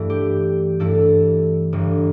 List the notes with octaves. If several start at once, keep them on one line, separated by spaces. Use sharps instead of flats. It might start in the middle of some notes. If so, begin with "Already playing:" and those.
Already playing: G2 E3 A3 E4
G4
G2 E3 A3 E4 A4
G1 G2 E3